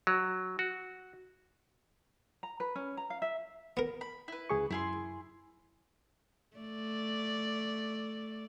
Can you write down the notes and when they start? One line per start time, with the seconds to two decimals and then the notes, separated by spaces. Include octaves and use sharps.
0.07 F#3
0.59 F#4
2.43 A#5
2.60 B4
2.76 C#4
2.97 A#5
3.10 F5
3.22 E5
3.77 B3 A#4
4.01 B5
4.28 E4 B4
4.49 C#2 G#4 C#6
4.70 F#2 E4 G#4 C6
6.56 A3 D5